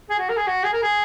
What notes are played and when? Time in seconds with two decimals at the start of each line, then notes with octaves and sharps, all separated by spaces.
0.10 G#4
0.19 F#4
0.29 A#4
0.37 G#4
0.47 F#4
0.64 G#4
0.73 A#4
0.82 G#4